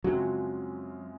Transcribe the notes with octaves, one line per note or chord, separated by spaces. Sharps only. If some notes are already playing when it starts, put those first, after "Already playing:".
F#2 C#3 F3 F#3 G#3 C4